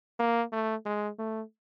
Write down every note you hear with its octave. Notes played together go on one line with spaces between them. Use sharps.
A#3
A3
G#3
A3